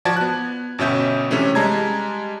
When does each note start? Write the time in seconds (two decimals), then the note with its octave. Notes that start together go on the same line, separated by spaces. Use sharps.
0.05 F3 F#4 D5 A5 G#6
0.17 B3 F#6
0.79 G1 B2 C#4 E5 G6
1.30 C3 E3 A3 C#4 D4
1.55 G3 G#3 A5 A#5 G#6